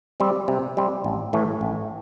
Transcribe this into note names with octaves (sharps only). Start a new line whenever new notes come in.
G3 C4
C3
G3 C4
A1
A2 E3 A3
A1